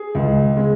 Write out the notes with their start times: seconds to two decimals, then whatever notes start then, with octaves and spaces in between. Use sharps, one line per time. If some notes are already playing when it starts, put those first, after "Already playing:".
Already playing: G#4
0.15 C#2
0.57 G#3